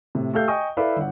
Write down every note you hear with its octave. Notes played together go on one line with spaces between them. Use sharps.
A2 C3
A3 G4 A4 F5 G6
D#5 G5 G#5 C#6 D#6
E4 A4 B4 D5 E5 F5
G1 F#5